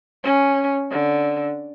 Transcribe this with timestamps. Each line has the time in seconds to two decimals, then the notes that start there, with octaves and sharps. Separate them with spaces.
0.24 C#4
0.91 D3